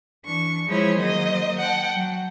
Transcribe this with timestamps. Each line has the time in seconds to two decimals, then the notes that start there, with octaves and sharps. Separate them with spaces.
0.24 E3 D4 C#6
0.66 F3 G#3 E4 G#4 C5 C#5
0.98 D#3 F#3 A#3 C5 D#5
1.59 F#5 G5 A5
1.95 F#3